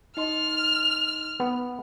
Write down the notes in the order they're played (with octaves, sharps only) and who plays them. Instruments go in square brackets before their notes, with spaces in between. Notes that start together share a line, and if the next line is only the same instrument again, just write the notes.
[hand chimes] D#4 D#5 C6 [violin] F6
[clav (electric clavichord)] B3